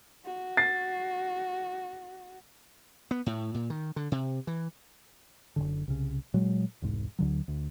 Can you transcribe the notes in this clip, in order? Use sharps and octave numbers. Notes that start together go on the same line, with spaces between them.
F#4
A6 C7
B3
A2
A#2
D#3
D3
C3
E3
F#1 B1 D3
C2 C#3
A#2 F#3 G#3
E1 C2 G#2
D2 D3 F#3
D2